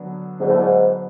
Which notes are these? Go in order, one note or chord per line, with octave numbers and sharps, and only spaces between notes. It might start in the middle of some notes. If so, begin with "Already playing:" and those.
Already playing: D3 F#3 B3 D4
G#2 D3 F#3 B3 D4
A2
G#2